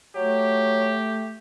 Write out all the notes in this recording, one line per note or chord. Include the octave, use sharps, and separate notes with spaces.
F#3 A3 G4